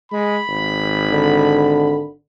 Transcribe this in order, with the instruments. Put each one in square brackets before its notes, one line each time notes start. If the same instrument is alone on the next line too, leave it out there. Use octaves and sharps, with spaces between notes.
[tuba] G#3 [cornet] B5
[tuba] G#1
[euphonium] D3